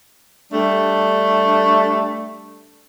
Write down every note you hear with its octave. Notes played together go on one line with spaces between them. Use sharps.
G3 A3 D4